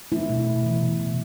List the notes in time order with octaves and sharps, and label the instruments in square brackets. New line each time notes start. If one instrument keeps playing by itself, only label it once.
[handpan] A3 E4
B2
B2
E3
C3
C3